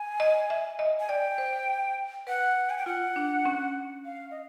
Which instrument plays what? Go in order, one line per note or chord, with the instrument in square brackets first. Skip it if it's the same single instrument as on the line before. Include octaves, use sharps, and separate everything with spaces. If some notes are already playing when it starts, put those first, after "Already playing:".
Already playing: [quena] G#5
[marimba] D#5
E5
D#5
[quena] G#5
[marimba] D5 [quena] G5
[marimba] C5
[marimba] B4 [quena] F#5
[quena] G#5
G5
[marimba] F4 [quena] F#5
[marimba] D4
C#4
[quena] F5
D#5